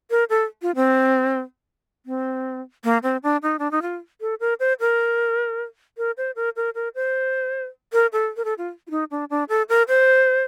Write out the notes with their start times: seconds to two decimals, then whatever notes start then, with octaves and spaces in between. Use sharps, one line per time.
0.10 A#4
0.30 A4
0.62 F4
0.76 C4
2.06 C4
2.84 A#3
3.03 C4
3.23 D4
3.43 D#4
3.59 D4
3.71 D#4
3.82 F4
4.21 A4
4.40 A#4
4.60 C5
4.80 A#4
5.98 A#4
6.17 C5
6.36 A#4
6.56 A#4
6.75 A#4
6.95 C5
7.93 A#4
8.13 A4
8.37 A#4
8.45 A4
8.58 F4
8.87 F4
8.91 D#4
9.11 D4
9.30 D4
9.49 A4
9.69 A#4
9.88 C5